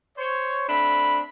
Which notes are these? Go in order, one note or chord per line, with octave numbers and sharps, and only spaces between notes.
C5 C#5
A3 C4 D4 B5